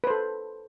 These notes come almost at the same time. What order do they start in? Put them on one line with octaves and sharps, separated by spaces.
B4 C5 A4